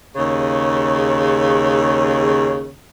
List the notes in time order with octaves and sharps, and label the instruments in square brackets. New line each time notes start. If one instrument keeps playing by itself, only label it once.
[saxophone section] D#2 C#3